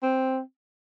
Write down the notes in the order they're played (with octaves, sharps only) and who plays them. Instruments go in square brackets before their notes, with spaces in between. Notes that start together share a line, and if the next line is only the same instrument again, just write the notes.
[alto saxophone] C4